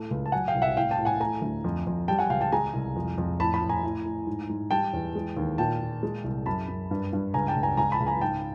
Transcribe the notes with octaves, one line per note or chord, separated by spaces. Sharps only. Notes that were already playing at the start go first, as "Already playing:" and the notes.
Already playing: A2 A3
C#2
A5
F#3 F#5 G#5
F5 G5
C2
E5 F#5
A2 F5 G5
G5 A5
A2
F#5 G#5
A3 G#5 A#5
D2
F2
F2
G3 G5 A5
F#5 G#5
C#2 F5 G5
G5 A5
G#3 G#5 A#5
C2
F2
F2
A2 A5 B5
A5 B5
A2
G#5 A#5
A2
A2
G#2
G#2
G3 G5 A5
E2
G#3
D#2
A#2 G5 A5
A#2
G#3
C2
F#2 A5 B5
F#2
G2
G2
C#2 G#5 A#5
G5 A5
C#2
G#5 A#5
C#2 G#5 A#5
A5 B5
C#2
G#5 A#5
G#2 G5 A5